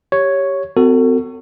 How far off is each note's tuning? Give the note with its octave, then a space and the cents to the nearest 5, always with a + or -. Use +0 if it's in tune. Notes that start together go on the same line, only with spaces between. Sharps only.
G4 +0 C#5 +0
C4 -40 F#4 +0 A4 +40